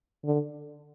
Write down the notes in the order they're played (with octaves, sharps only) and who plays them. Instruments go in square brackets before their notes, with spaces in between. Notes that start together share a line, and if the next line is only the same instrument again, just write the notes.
[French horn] D3